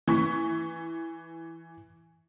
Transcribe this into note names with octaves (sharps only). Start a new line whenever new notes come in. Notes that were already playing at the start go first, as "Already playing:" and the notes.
E3 C#6 B6